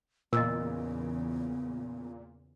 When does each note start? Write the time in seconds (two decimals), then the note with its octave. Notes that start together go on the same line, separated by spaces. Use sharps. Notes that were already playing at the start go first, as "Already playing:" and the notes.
0.33 E2 A#2 C#3 B3 A#4 D#5